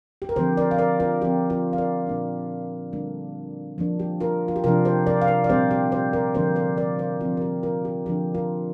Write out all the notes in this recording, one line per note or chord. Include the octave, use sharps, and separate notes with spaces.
G4
A#4
D3 F3 C4 G4 C5
A#4 D5
F5
A#4 D5
F4 A#4
F3 C4 G4
F4 A#4
F5
A#4 D5
A#2 A#3 D4
D3 G3 A#3 D4
F3 A#3 D4
G4
F4 A#4
F4
G4
C3 F3 D4 F4 A#4
G4 C5
A#4 D5
F5
A#4 D5
D5
A#2 G3 C4 G4 C5
G4
G4 C5
A#4 D5
D3 F3 A#3 G4 C5
A#4 D5
A#4 D5
C5 F5
F3 C4 F4
A#4
G4
F4 A#4
G4
D3 F3 D4 G4
F4 A#4